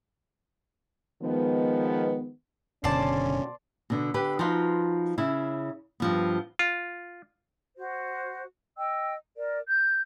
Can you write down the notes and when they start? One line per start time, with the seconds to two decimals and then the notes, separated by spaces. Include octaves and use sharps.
1.23 D#3 F3 G#3 B3
2.84 F#1 B2 D3 C#4 C5 D5 A5
3.90 B2 D3
4.14 D3 G4 B4
4.39 F3 D#4 F4 F#4 B4
5.18 C#3 E4
6.00 G2 F3 B3
6.59 F4
7.76 F#4 C5
8.77 D#5 G5 E6
9.36 A#4 D5
9.68 G6